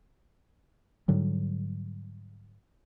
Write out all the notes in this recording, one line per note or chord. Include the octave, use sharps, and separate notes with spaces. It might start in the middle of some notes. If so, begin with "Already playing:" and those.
G#2 D3 F#3 G3